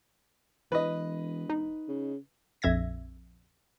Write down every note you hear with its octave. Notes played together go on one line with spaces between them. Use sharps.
E1 E3 B4 D#5
D#4
C#3
A#1 F2 E5 G#6 A#6